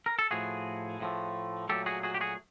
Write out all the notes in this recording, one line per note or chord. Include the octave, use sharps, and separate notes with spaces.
A#4
A4
A2 F3 A3 F#4 G#4
A2 F3 A3
A#2 F#3 A3 G4 A4
F#4 G#4
F#4 G#4
G4
F#4 G#4